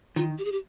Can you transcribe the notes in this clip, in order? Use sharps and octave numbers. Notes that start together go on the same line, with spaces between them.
D#3 F4
G4
G#4
G4